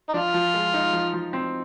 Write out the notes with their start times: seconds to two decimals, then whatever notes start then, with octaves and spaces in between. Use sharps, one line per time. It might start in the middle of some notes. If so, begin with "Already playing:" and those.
0.09 D#4
0.13 F3 D4 F4
0.34 F3
0.54 G#3
0.74 D#4
0.93 F3
1.14 F3
1.33 C4